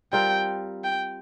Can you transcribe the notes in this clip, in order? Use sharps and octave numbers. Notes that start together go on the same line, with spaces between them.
G3 C4 F4 A#4 G5
G5